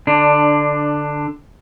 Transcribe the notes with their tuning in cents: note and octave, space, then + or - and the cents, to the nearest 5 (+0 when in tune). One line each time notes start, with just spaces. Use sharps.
D3 +0 D4 +15